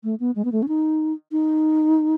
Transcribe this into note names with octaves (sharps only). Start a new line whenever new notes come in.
A3
B3
G#3
B3
A3
C#4
D#4
D#4